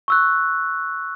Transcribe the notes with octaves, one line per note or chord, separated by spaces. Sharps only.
C#6 E6 F#6